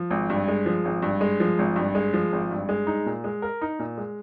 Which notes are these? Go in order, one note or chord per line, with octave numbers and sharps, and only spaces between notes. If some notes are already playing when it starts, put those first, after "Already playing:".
Already playing: F3
G#1
G2
G#3
F3
G#1
G2
G#3
F3
G#1
G2
G#3
F3
G#1
G2
G#3
D#4
A#2
G#3
A#4
D#4
A#2
G#3